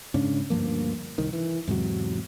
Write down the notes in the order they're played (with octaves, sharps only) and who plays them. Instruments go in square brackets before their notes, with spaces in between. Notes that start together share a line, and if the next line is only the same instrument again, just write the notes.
[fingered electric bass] G#2 C#3 C#4 D4
D2 G2 F3 A#3
C2 D#3
E3
E2 G#2 C3 F#3